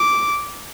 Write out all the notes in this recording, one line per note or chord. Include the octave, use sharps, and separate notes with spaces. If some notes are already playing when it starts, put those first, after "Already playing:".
Already playing: D6